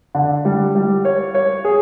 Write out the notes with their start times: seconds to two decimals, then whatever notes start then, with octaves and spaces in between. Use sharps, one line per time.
0.15 D3
0.45 G3
0.75 G3
1.05 C#5
1.34 C#5
1.65 G#4